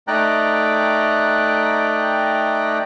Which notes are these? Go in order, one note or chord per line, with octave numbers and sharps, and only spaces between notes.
A3 D#4 D5 G5 A#5 F#6